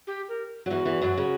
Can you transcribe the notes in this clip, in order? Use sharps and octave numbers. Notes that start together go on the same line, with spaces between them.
G4
A#4
F#3
E2 E3 F#4
E2 E3
F#2 F#3
C#3 C#4